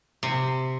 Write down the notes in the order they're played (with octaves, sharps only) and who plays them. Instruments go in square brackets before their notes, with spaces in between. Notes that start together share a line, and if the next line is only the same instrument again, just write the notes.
[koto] C3